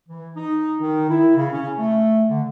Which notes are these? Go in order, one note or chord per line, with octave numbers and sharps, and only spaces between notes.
E3
D#4
D#3
E4
C#3
C#4
A3
D3